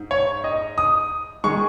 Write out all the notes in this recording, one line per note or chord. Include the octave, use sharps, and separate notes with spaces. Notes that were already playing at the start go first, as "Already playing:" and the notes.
Already playing: G#2
C#5
D#5
D#6
D#3 G#3 C#6